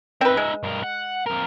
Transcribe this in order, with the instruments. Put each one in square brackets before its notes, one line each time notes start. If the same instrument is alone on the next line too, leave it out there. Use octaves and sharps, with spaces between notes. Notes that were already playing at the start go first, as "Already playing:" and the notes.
[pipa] C4 B4 [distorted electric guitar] D#4 E5
[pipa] G#3
[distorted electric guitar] G2 A#4
F#5
F2 A#4